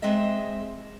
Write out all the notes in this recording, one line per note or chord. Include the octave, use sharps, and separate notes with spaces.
G#3 C4 G#4 D#5 E5